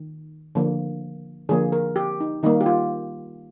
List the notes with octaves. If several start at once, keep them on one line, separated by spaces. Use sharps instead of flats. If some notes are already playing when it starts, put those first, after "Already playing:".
Already playing: D#3
D3 F3 A#3
D3 F3 A#3 G#4
A#4
G4
D#4
D#3 G3 A#3 D#4
G4
F4